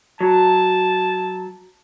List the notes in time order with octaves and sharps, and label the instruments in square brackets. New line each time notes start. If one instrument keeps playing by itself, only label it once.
[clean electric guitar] F#3 [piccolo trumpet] A5